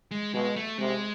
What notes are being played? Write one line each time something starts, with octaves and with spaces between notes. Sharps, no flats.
G#3
B2 G#3
A3
C3 G#3